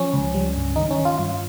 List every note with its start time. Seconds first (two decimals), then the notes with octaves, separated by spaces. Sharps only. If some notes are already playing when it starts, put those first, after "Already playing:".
Already playing: F3 C#4
0.13 C#2
0.34 G3
0.56 G2
0.76 D#3 D#4
0.91 C#4
0.98 D#3
1.05 F4
1.18 G2 F4